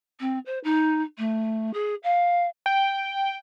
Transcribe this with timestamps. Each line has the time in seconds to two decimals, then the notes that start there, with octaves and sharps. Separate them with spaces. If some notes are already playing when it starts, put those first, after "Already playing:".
0.20 C4
0.46 C5
0.64 D#4
1.18 A3
1.74 G#4
2.04 F5
2.66 G5